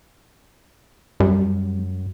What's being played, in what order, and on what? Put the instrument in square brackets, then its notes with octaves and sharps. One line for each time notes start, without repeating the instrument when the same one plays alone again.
[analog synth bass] F#2 [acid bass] G3